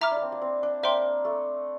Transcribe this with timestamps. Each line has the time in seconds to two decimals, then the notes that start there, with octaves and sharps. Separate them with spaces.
0.01 E4 E5 A#5 D6 F6
0.11 D4
0.17 A#3
0.22 C4
0.32 A#3
0.42 C4
0.63 D4
0.83 A#3 C5 E5 G5 C6
1.25 A3